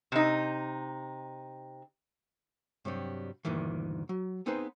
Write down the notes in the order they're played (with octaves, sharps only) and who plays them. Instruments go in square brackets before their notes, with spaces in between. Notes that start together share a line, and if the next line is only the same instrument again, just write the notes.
[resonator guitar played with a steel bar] C3 D#4
[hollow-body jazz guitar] G2 C3 F#3 G3
D2 G2 A#2 D#3 E3
F#3
B3 C4 D#4 G#4 B4 C5